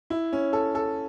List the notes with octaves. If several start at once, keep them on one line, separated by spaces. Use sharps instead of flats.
E4
C#4
A4
A4